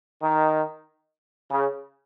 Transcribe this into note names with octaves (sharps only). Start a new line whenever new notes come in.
D#3
C#3